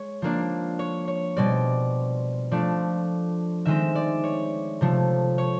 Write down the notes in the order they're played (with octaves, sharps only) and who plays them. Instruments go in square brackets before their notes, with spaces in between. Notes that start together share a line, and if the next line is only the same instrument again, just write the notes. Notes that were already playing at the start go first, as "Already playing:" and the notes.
Already playing: [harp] G#3 C#5
F3 A#3 D4
C#5
C#5
B2 G3 C4 D5
F3 A3 D4 D5
D#3 G#3 C4 E5
D5
C#5
C3 F3 A3
C#5